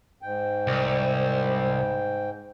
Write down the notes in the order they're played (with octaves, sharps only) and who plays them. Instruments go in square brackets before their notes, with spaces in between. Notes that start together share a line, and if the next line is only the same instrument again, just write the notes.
[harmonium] G#2 G5
[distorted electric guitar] C2